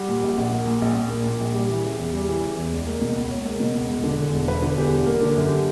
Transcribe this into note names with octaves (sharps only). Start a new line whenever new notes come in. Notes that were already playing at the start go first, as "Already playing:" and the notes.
Already playing: G3 F#5
A#2
A#1
A#1
A#3
A#2
A#1
A#1
A#3
A#2
A#1
G3
E3
C#3
E2
G3
E3
C#3
E2
C#2
A#3
B2
C#2
C#2 C#5
A#3
B2
C#2
E1
D3
E2
E1
E1 B4
D3
E2 G4
E1
A#3 A#4
D3 A#4
F#2
G4